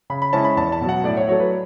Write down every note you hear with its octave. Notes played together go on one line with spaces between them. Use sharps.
C#3 B5
B5
G#3 C#4 E4 A5
B5
E2 A5
A5
B2 F#3
F#5
A2 D5
C#5
F#3 A3 C#5
B4